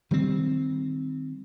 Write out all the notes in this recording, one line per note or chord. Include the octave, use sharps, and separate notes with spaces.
D#3 G3 G#3 C4